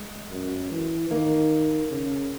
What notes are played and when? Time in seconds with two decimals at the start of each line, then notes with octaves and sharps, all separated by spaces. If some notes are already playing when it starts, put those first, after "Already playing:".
Already playing: G#3
0.31 F#2
0.70 E3
1.10 D#3 A#3
1.91 C#3